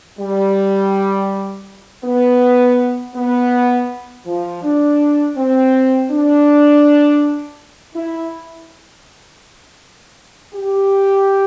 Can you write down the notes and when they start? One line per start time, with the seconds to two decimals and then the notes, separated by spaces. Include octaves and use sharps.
0.18 G3
2.04 B3
3.14 B3
4.26 F3
4.63 D4
5.36 C4
6.11 D4
7.95 E4
10.54 G4